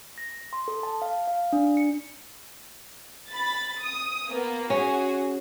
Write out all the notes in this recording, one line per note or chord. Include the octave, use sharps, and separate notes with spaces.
A#6
C6
A4
A5
F5
F5
D4
C#7
B5 A6
D#6
A#3 B3
C#4 F#4 G#4